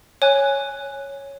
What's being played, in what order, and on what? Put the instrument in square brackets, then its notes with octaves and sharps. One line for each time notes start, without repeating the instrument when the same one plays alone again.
[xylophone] C#5 G#5 F#6